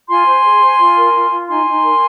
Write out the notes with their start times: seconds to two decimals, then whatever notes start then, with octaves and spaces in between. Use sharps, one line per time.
0.09 F4 G#5 C6
0.26 C5
0.44 G#4
0.61 C5
0.79 F4
0.96 A#4
1.14 F4
1.31 F4
1.48 D#4 G#5 C6
1.67 D#4
1.83 A#4